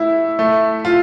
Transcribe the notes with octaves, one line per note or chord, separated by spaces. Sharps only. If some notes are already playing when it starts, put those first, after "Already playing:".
Already playing: A3 E4
A3
F4